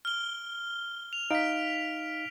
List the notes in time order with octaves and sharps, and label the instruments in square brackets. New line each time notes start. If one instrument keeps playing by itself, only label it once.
[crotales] F6 G7
F7
[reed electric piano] D#4 F5 [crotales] B6 D7